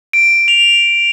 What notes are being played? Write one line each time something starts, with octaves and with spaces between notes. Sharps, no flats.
D7
F7